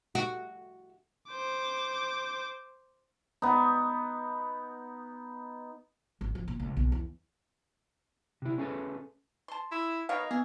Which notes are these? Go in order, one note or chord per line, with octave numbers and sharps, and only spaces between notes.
F#4
C5 D6
B3 D#4
G#1
F3
A#2
C#2
B1
E2
C3 E4
C#4 G#4 A4 B4
A5 C6
E4
B2 D#4 A#4 C#5 F5
B3 G#4